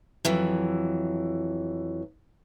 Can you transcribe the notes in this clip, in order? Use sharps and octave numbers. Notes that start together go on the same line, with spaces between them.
F2 E3 F#3